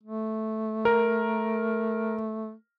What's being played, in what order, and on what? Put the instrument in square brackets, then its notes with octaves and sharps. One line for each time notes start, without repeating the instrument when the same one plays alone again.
[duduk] A3
[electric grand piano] A#4